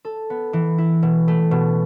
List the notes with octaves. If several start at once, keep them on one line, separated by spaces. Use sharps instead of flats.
A4
B3
E3
E4
B2
A3
B2